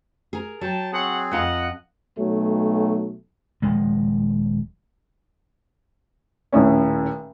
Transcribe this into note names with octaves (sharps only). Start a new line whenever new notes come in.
G#4 A#4
F#3 G5 A5
C4 G#4 C#5 F#5
F2 F4 D#5 F#5 A5
B1 F#3 A3
D#1 F3 G#3
D#1 A2 C#4